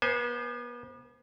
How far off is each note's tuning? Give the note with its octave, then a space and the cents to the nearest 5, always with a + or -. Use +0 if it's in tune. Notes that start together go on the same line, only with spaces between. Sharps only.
B3 -40 C5 +0 G#5 +0